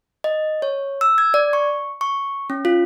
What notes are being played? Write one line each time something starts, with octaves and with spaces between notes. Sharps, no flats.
D#5
C#5
E6
G#6
D5
C#6
C#6
C#4
F4